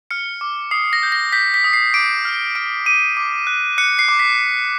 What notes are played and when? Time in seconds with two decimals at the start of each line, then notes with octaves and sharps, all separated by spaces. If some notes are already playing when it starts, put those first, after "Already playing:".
0.11 F6 C#7
0.41 D6
0.71 D#6 C7
0.93 A#6
1.03 G6
1.12 A#6
1.33 G6 B6
1.54 B6
1.64 D#6
1.73 C7
1.94 D6 D7
2.25 F6
2.55 F6 D7
2.86 D6 D#7
3.17 D6
3.47 F#6
3.78 F#6 C#7
3.99 C7
4.09 D6
4.19 B6